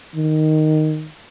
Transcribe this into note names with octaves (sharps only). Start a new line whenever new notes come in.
D#3